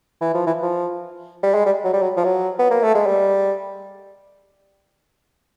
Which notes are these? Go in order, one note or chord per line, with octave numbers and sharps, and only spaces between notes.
E3
F3
E3
F3
G3
G#3
G3
F#3
G3
F#3
F3
F#3
B3
A#3
A3
G#3
G3